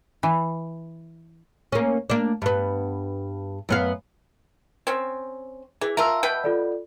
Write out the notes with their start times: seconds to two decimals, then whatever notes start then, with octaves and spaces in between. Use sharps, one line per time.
0.23 E3
1.72 A#3 C#4
2.10 A#3 D4
2.42 G2 B3
3.69 F#2 B3 F5
4.87 C4 C#4
5.81 E3 G#4
5.97 F4 A#4 E5 A5 E6
6.23 B2 B4 G5
6.44 F4 A4 D5